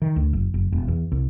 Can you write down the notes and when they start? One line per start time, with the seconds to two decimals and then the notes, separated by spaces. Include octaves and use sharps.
0.02 D#3
0.16 D2
0.33 F#1
0.54 F#1
0.72 E1
0.88 E2
1.12 C2